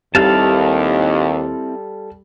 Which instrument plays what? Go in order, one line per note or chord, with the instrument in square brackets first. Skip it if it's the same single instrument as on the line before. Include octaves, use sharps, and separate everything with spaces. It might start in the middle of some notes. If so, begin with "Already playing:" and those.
[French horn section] D#2 [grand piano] G3 [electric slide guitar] C4 E4 [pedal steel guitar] A4 F5 A5